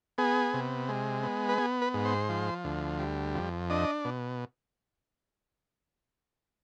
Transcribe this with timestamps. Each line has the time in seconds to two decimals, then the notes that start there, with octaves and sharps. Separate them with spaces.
0.18 B3 G#4
0.54 C3
0.89 G#3
1.23 B3
1.49 B4
1.58 B3 G#4
1.82 B4
1.94 G#2
2.05 C5
2.29 F3
2.64 D2
2.99 G3
3.35 F2
3.70 D4 D#5
4.05 B2